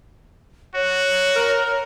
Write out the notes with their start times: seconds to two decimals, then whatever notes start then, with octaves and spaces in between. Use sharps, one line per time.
0.75 F#4 C#5
1.35 A#4